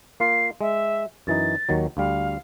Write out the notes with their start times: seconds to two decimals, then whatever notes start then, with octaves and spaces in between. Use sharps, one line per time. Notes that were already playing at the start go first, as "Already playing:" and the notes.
0.20 A#3 F4 C7
0.61 G#3 E5
1.27 F#2 E3 D#4 A6
1.69 D#2 D#3 F#3
1.97 D2 G3 F5